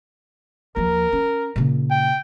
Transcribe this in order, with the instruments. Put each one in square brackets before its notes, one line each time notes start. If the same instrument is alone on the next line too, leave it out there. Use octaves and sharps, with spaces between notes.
[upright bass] D#2 F3 [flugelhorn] A#4
[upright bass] C#4
A#2 C#3
[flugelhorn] G5